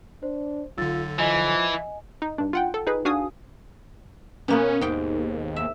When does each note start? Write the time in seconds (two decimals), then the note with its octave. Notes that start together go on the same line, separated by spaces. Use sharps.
0.23 D4 C5
0.78 B1 D3 F4 E6 A6
1.19 E3 F3 D#5 G#5
2.22 D#4
2.38 G2 D4
2.53 F4 F#5 G5
2.74 A4
2.87 D#4 G#4 B4
3.05 D4 F#4 F5 G#5 D#6
4.48 B2 A#3 B3 C#4
4.81 D#2 G#2 G5
5.56 E5